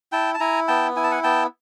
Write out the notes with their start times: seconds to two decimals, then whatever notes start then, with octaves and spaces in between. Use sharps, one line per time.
0.12 E4 G5 A5
0.34 A5
0.40 E4 G#5 A#5
0.68 B3 G5 A5
0.96 E4 G#5
1.04 A5
1.11 F#5 G#5
1.23 B3 G5 A5